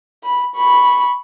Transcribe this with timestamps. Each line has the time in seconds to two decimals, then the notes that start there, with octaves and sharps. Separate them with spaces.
0.24 B5
0.56 B5 C#6